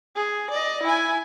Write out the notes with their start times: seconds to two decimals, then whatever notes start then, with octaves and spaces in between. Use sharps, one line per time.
0.15 G#4
0.50 D5 D#5
0.82 E4 G#5